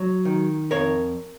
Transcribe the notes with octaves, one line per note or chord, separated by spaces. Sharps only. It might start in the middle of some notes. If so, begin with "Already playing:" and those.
Already playing: F#3
D#3
F2 A#4 C#5